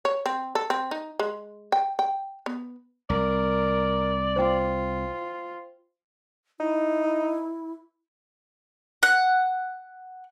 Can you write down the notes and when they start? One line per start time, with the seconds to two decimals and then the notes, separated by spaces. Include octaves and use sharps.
0.05 C#5
0.26 C4
0.55 A4
0.70 C4
0.91 D#4
1.19 G#3
1.72 G5
1.99 G5
2.46 B3
3.10 C2 A#4 D5
4.36 F4 C5 G5
6.60 D#4 E4
9.03 F#5